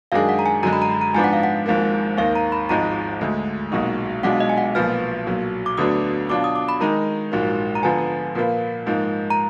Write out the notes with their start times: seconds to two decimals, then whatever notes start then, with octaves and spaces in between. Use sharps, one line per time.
0.12 F#2 D#3 G#3 D4 G#4 F5
0.29 F#5
0.39 A#5
0.46 G#5
0.63 F#2 D3 G#3 A#5
0.73 B5
0.82 A#5
0.91 B5
1.01 A#5
1.14 G#2 F3 B3 D4 G#5
1.24 F#5
1.33 F5
1.43 F#5
1.66 G#1 G#2 F3 A#3
2.17 D#2 D#3 A#3 F5
2.35 A#5
2.52 B5
2.69 G#1 G#2 F3 G#3 D#4 A#5
3.21 D2 D3 G#3
3.72 B1 A#2 G#3 D#4 F#4
4.23 B1 B2 G#3 D4 F4 F#5
4.40 D#5
4.49 G#5
4.58 F#5
4.75 B1 A#2 F3 B3 F6
5.26 B1 A#2 F#3
5.66 D6
5.77 D2 D3 F#3 B3 D4 D#6
6.29 B2 F#3 D4 F4 D6
6.44 D#6
6.55 D6
6.69 B5
6.80 D#3 G#3 D#4 A#5
7.32 A#1 G#2 F#3 A#3
7.75 A#5
7.83 D3 F3 B3 G#5
8.35 A#2 F3 A#3 F4 B4
8.86 G#2 F3 A#3 D#4
9.30 A#5